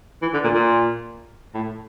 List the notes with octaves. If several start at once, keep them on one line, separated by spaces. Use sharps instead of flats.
E3
D3
A#2
A#2
A2